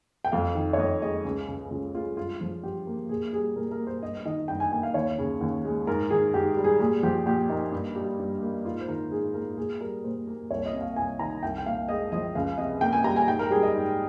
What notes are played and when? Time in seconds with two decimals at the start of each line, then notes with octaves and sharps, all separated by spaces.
0.25 G5
0.32 F2 F5
0.55 D#3
0.73 C#5
0.78 F2 D#5
1.02 G#3 D#5
1.25 C#2
1.48 C#3
1.71 C#2 F4
1.94 G#3 F4
2.17 G2 F4
2.40 F3 F4
2.63 G2 G4
2.87 A#3
3.09 A#2 G#4
3.33 G3 G#4
3.56 A#2 A#4
3.71 A#4
3.79 A#3
3.87 C5
4.02 G2 D#5
4.25 D#3 D#5
4.48 G2 G5
4.60 G#5
4.72 A#3 G#5
4.83 F5
4.94 D#2 C#5
5.18 C#3
5.41 D#2
5.65 G#3
5.87 G#2 A#4
6.10 D#3 G#4
6.34 G#2 G4
6.57 G3
6.64 G#4
6.80 A#2 G#4
7.03 F3 G4
7.26 A#2 G4
7.49 A#3 D#4
7.72 G2
7.96 G3
8.19 G2
8.42 A#3
8.65 G#2 F4
8.81 C5
8.88 D#3 A#4
9.11 G#2 G#4
9.34 A#3 A#4
9.57 A#2 G#4
9.81 G3 A#4
10.04 A#2 C5
10.27 A#3
10.51 C2 C#5
10.66 D#5
10.73 C3
10.81 F5
10.96 C2 G#5
11.19 D#3 A#5
11.43 C2 G5
11.58 G5
11.66 A#2 F5
11.89 G#3 D#5
12.12 F3 D#5
12.35 C#2 F5
12.58 C3 D#5
12.81 A#3 G5
12.93 G#5
13.04 G3 A#5
13.16 G#5
13.28 G#2 G5
13.39 A#4
13.51 G3 G#4
13.63 D#5
13.74 G#2